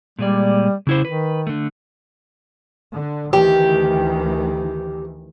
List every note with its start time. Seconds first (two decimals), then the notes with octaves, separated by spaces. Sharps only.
0.19 A#2 G3 G#3 D5
0.87 C#3 E4 C5
1.05 D#3 B4
1.47 D3 A3
2.93 D3
3.33 D2 D#3 E3 G4